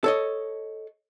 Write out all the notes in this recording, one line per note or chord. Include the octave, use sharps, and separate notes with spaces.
A4 C#5 D#5